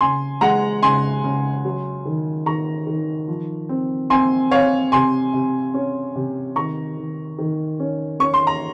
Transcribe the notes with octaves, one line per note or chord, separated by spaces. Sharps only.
C#3 G#5 C6
G#3 F#5 A#5
C#3 G#5 C6
C#3
F#3
D#3
D#3 A#5 C#6
D#3
F3
C4
C4 G#5 C6
C4 C#5 F5
C3 G#5 C6
C3
C#4
C3
D#3 A#5 C#6
D#3
D#3
C#4
C#4 C#6
C6
A#5